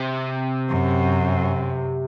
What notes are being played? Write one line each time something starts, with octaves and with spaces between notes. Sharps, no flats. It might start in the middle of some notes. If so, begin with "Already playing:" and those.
Already playing: C3
F#2